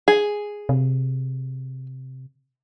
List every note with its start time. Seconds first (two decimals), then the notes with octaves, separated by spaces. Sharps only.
0.08 G#4
0.69 C3